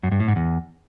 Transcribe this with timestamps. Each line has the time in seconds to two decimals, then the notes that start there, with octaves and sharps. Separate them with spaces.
0.03 F#2
0.12 G2
0.20 A2
0.28 G#2
0.36 E2